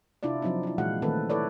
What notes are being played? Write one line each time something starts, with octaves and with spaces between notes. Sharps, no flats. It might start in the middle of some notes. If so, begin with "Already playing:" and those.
C3 D4 E4 F4 D5
F3 F#3 C4 D4 D#4
D4 E4
A#2 E3 G#3 F#4 F5 F#5
D#3 E3 A3 C4 A4 B4
E4 A4 B4 C#5 D5